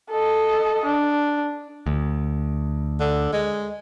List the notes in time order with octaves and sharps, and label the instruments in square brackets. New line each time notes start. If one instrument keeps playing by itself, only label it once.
[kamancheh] A4 D#5
D4
[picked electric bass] D2
[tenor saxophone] D3
G#3